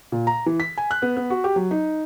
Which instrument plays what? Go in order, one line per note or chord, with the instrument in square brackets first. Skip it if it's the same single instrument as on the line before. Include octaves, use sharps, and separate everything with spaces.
[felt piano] A#2
A#5
E3
B6
G#5
F#6
B3
B3
F#4
G4
F#3
D#4